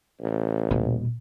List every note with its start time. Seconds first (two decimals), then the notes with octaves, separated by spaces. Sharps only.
0.21 A1
0.71 D#1 B2